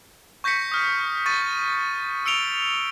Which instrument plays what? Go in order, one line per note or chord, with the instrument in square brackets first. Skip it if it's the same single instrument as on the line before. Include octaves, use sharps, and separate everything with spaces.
[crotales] C#6 G6 A#6 B6 C#7
D#6 F6
C#6 A6 D#7
E6 C#7 D7 F7 G7